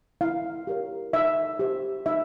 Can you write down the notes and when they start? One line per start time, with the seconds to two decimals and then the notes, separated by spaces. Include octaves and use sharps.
0.21 E4 F5
0.67 G4 A#4 C#5
1.13 D#4 E5
1.59 G4 C5
2.06 D#4 E5